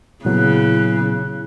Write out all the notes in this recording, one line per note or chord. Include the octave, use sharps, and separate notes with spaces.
A#2 C#3 F#3 B3 E4 F#6